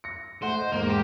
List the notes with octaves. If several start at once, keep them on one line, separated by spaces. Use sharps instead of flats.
A#6 C#7
A3 C5 F#5
D#5
E2 G#2 A#3
G4